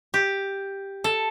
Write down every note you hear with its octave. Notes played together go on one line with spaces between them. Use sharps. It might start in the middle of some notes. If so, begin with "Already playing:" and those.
G4
A4